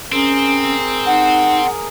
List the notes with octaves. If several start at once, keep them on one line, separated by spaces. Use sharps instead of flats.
C4 C#4 G#4 A#4
D#4 F#5